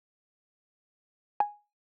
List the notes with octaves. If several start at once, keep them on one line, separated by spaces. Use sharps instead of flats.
G#5